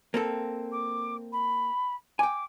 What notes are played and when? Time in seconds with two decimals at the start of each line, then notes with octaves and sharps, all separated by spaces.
0.14 A#3 C4 A4
0.71 D6
1.32 B5
2.19 G5 G#5 D6